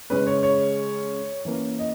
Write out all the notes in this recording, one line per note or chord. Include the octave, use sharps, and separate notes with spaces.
C#3 G#3 C#4 B4
C#5
C#5
E3 A#3 C#4
D#5